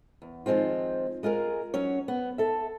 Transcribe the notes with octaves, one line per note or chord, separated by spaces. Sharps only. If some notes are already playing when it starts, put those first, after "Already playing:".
E2
D#3 F3 G#3 C4 F4
G#3 F4 G#4 A#4
F#3 C#4 C#5
B3
A4 E5